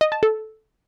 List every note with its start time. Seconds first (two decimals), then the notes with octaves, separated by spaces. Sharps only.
0.01 D#5
0.12 A5
0.23 A4